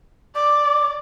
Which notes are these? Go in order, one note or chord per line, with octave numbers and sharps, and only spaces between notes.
D5 D6